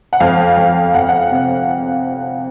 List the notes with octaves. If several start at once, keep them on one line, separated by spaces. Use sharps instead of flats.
F#5
F2 F5
F2
F2 F#5
F#5
C3